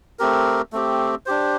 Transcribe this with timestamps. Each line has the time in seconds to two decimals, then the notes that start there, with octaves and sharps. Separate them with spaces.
0.19 A3 C4 G4 A#4
0.72 A3 C4 G4
1.26 D4 G4 C5